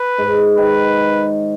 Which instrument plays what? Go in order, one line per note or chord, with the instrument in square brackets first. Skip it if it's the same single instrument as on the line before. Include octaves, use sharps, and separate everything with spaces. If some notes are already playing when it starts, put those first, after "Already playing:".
Already playing: [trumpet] B4
[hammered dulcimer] G#2
[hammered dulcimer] D#3 [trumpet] B4